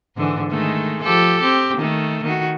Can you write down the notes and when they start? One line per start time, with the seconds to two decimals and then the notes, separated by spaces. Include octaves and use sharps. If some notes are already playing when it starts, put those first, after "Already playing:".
0.17 G#2 D3 E3
0.50 D#3 G#3 A3
1.03 F3 G4 A4
1.41 C4 G4
1.78 D#3 A3
2.23 D#3 F#4